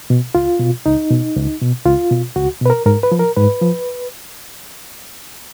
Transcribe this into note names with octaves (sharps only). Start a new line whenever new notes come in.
B2
C#2 F4
B2
C#2 D#4
B2
C#2
B2
C#2 F4
B2
C#2 F#4
B2 B4
A#4
G#2 A#4
B4
F3
A#4
G#2 B4
F3